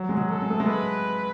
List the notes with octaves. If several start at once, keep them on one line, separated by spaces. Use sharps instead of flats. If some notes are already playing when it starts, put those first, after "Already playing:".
Already playing: F#3
G#3
F#3
A4
G#3
A3
G#3
B4